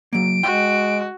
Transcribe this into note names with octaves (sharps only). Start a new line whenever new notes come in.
F#3 A#3 D7
G#3 F#4 G5